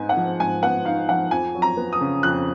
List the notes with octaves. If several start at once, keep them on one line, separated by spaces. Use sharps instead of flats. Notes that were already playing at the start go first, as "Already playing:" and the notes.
Already playing: G#2 B3 D#4 G#5
F#5
F3
G#2 G#5
B3 F#5
D#4 F5
F3 F#5
F2 G#5
F#3
A#5
B3
D#6
C#3
F2 F#6